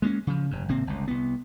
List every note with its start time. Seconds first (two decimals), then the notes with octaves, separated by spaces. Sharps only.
0.02 G#3 A#3 B3 C#4
0.27 C#3 F3
0.51 F1 G2
0.68 G#1 C3 A#3 C4
0.87 G1 C#2
1.08 C2 B3